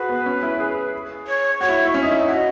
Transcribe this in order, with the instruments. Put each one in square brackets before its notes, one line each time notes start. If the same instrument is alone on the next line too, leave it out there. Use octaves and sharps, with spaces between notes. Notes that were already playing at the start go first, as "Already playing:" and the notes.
Already playing: [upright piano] F#4 G#4 [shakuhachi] B4
[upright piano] B3
C#4
E4
G#4
[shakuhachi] C#5
[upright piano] F#4 [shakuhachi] C#5
[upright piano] E4
E4
[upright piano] C#4 [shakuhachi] E5
[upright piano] D#4
E4
[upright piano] F#4 [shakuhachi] D#5